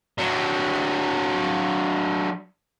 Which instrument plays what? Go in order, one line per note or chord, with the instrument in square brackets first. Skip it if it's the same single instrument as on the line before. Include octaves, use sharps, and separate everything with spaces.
[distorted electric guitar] F#3 D4